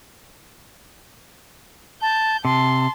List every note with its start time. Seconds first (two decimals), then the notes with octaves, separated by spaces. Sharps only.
2.02 A5 G6
2.45 C3 A5 C6